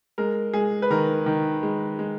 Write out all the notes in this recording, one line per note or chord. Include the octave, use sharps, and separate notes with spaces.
G#3 A#4
G#3 G#4
B4
D#3 A#4
D#3
G#3
G#3